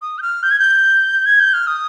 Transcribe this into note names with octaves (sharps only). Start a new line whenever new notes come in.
D#6
G6
F6
G6
G#6
G6
G#6
G6
F6
D#6